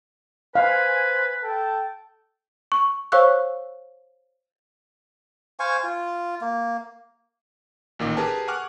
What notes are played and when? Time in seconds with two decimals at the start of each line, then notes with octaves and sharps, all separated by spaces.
0.55 B4 C5 F5 G#5
1.42 A4 G5 A5
2.72 C#6
3.12 C5 C#5 F5 C#6 E6 F#6
5.60 C5 F5 G#5 C#6
5.84 F4
6.41 A#3
7.99 A1 A#2 D#3 D6
8.17 G4 G#4 A#4 B4 G#5 A5
8.48 F#5 G#5 C#6 D6 F6 F#6